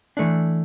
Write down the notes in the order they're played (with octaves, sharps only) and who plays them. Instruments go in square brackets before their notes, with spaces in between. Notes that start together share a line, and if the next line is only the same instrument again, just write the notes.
[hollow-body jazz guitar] E3 A3 D4